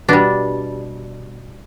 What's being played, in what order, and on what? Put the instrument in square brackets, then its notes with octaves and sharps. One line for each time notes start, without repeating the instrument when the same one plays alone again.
[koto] B2 G3 D4